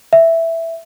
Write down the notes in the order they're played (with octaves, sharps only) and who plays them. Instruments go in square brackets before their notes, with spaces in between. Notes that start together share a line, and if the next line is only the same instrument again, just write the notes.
[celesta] E5